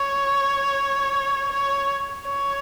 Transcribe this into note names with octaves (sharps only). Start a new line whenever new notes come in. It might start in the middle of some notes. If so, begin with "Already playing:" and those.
Already playing: C#5
C#5
C#5